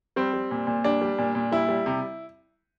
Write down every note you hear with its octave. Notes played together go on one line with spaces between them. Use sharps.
G3 C4
G3
A#2
A#2
G3 D4
G3
A#2
A#2
G3 E4
G3
C3